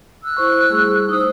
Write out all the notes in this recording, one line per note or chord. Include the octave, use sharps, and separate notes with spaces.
E6 F#6
E4 C5 C#6
G3 A3 G#4
D#4 C5 D#6 E6